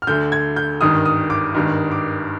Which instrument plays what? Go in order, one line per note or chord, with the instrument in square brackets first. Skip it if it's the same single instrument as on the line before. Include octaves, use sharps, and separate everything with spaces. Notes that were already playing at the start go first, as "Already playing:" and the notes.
[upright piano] F6
D2 D3 G6
G#6
G6
G#1 G2 D#3 D#6
D#6
D6
G#1 G2 D#3
D6